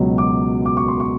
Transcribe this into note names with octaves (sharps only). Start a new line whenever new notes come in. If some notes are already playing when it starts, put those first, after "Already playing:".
Already playing: C#2 B2 F#3
D6
D6
C#6
C6
C#6